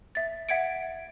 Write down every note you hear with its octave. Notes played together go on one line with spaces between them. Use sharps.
E5 A6
E5 F#5 G#6 C#7 D7